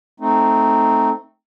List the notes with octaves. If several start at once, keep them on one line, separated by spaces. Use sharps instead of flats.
A3 C4 D#4